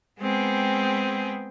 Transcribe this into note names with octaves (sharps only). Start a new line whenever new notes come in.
G#3 B3 C4 G#4 G5